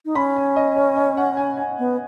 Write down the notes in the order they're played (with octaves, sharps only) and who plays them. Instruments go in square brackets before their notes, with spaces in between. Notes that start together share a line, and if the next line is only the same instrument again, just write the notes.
[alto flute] D#4
[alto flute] C#4 [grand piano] B5
[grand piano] G#5
D#5
C#5
D#5
F#5
G#5
G#5
[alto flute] B3